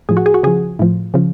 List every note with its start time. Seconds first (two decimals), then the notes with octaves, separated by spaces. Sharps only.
0.09 A2 F3 G#4
0.17 F#4
0.26 G#4
0.34 F#4
0.43 C#3 F3 G#4
0.79 A2 F3
1.14 C#3 F3